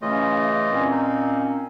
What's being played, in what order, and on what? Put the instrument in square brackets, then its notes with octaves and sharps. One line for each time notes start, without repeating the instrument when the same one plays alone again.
[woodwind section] C#3 A3 [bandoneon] E3 F4 D#5 [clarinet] C#4
[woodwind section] A#2 C4 [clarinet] C#4
[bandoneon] D#4